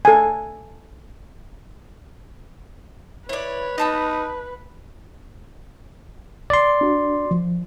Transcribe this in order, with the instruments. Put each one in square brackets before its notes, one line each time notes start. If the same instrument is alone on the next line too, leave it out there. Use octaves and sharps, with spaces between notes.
[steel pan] A4 G#5
[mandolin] E4 D5 [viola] B4 [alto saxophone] C#5
[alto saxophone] D#4 [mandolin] D#5 A5 B5
[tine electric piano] D5 C6
[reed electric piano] D4 F#4
F3